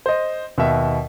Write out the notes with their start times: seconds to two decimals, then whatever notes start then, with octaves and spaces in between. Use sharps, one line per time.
0.06 C5 D#5
0.58 D#2 B2 E5